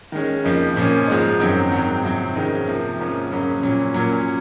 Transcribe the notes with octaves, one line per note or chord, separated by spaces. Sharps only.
D#3 G#3 C#4
F2 C#3 F3 A#3 D#4
A#2 F3 A#3 C#4
G#2 F3 G#3 D#4
F#2 D#3 F#3 C4
G#2 D#3 F#3 C4
F2 C3 F#3 C4
G#2 D#3 G#3 C#4
C3 F3 A#3
G#2 F3 A#3 C#4
F2 C#3 F#3 A#3 C#4
A#2 F#3 C#4
A#2 F#3 A#3 C#4